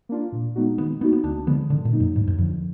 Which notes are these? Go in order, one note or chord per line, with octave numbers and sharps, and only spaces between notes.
A#3 D4 F4
A#2
G#3 B3 D#4 F#4
D#3 B3
A#3 B3 D#4 F#4
B3
D2 D4
D3 F3 G#3 B3
G#2 D3
A#2
F#3 A#3 D#4
F#2
D2 G#2
F#2
F2 D3 F3